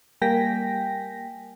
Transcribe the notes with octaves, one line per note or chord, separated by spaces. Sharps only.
G3 A#3 G5 G#5 A#6 B6